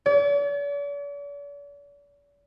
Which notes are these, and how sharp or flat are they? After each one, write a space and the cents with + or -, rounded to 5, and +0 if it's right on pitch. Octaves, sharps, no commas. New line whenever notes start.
D5 -45